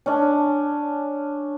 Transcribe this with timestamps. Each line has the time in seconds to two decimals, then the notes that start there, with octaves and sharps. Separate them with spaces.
0.06 C#4 D4